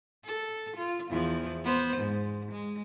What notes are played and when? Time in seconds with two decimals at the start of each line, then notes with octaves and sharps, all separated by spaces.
0.25 A4
0.76 F4
1.10 E2 F3
1.65 B3 C5
1.97 G#2
2.52 G#3